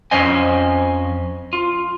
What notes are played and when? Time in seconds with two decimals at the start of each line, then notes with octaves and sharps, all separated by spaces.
0.11 F2 C#4 C5 D#5 G#5
1.53 F4